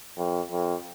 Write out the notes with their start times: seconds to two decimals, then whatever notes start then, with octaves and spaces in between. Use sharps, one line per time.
0.17 F2
0.51 F2